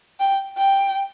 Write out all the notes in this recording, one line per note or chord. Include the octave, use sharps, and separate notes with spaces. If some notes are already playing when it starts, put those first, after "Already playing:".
G5
G5